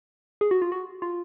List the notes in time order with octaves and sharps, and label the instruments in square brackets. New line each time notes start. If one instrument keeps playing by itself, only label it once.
[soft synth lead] G#4
F#4
F4
F#4
F4